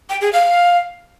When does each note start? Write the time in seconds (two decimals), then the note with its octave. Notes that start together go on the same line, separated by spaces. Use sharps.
0.10 G5
0.21 G#4
0.33 F5